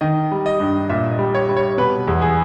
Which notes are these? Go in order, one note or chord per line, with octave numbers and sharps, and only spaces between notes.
D#3 D#5
G3
D#5
G2
A#2 E5
D#5
G3
C#5
G3
C#5
B2 B4
E2
G#4